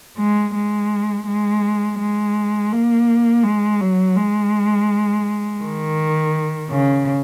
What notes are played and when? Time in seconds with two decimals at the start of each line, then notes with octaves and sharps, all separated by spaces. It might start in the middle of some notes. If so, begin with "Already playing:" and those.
0.18 G#3
0.54 G#3
1.27 G#3
1.99 G#3
2.72 A#3
3.43 G#3
3.80 F#3
4.16 G#3
5.61 D#3
6.70 C#3